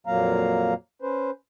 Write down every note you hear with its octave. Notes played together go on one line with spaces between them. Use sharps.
F2 A#2 F#3 A#3 F5 A#5
C#4 B4 C5